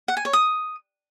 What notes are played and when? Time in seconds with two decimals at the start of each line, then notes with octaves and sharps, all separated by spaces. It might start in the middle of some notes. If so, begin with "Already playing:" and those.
0.08 F#5
0.17 G#5
0.25 C#5
0.33 D#6